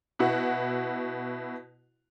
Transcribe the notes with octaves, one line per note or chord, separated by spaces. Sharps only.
B2 E4 F#4